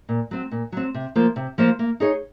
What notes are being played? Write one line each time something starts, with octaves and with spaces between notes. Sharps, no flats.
A#2
F#3 C4
A#2
F#3 C4
C3
F3 A#3 F4 C5
C3
F3 A#3 F4 C5
A#3
D#4 G#4 C#5